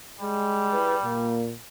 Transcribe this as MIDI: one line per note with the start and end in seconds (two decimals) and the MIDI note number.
0.21 1.39 55
0.21 0.76 56
0.71 0.95 64
0.71 0.95 68
0.71 0.95 71
1.04 1.52 46
1.04 1.44 58